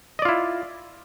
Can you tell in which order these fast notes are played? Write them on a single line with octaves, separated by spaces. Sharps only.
D#5 D5 F4 E4